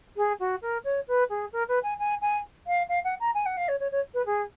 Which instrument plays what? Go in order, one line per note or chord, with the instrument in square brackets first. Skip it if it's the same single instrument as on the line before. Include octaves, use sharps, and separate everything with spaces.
[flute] G#4
F#4
A#4
C#5
B4
G#4
A#4
B4
G#5
G#5
G#5
F5
F5
F#5
A#5
G#5
F#5
F5
C#5
C#5
C#5
B4
G#4